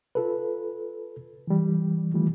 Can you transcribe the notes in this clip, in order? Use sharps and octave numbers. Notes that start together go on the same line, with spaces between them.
F4 A4 B4
E3 G3
D#3 E3 G3 A3 F4